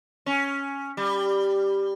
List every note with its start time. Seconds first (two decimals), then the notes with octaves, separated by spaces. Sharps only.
0.26 C#4
0.97 G3